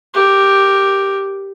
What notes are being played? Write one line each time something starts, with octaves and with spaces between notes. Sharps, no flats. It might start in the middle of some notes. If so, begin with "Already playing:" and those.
G4 A#4